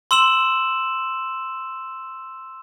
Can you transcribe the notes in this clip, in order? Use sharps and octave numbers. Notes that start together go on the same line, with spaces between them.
C6 E6 E7 F#7